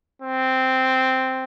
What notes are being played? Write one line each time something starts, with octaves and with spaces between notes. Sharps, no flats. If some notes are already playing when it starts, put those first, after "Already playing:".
C4